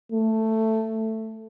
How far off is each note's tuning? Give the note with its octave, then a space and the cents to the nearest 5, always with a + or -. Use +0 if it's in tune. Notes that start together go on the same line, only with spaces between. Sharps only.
A3 +5